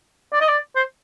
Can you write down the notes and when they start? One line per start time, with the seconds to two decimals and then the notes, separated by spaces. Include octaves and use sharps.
0.33 D5
0.41 D#5
0.49 D5
0.76 C5